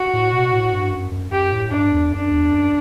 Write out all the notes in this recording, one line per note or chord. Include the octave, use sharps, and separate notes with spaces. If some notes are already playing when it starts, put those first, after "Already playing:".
Already playing: F#4
A2
B2
A2
G2
F#2
F#2
F#2 G4
A2
G2 D4
E2
F#2 D4
E2
F#2